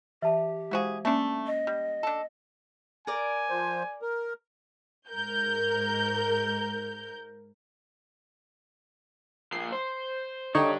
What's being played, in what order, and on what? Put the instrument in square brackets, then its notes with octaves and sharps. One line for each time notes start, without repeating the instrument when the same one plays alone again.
[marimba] E3 [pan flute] G4 [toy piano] E5 A5
[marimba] G#3 C5 F5 [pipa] E4 F#4 G#4
[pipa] A3 D4 [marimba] A#3 C#4
[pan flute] D#5
[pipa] G3
D4 A4
[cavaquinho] A#4 D5 [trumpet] G#5
[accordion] F3 C5
A#4
[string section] G#2 A#4 G6
[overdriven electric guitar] F3 A#3 [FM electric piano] C7
[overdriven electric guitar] C5
[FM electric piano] D3 D#4 C#5 [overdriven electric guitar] D4 G4